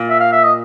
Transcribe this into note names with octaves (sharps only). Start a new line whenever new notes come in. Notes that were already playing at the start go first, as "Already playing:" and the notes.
Already playing: A#2
E5
F5
E5
D#5